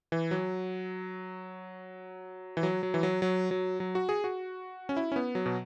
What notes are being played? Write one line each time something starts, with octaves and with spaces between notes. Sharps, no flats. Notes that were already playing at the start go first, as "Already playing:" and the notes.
E3
F#3
E3
F#3
F#3
E3
F#3
F#3
F#3
F#3
F#4
G#4
F#4
C#4
E4
C#4
B3
F#3
B2